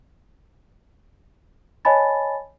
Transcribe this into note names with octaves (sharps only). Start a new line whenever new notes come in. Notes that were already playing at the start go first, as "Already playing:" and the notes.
C#5 D#5 G#5 A5 B5 A6